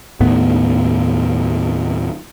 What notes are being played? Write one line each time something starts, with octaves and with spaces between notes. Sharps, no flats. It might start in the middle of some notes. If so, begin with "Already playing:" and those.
D#2 A2 B3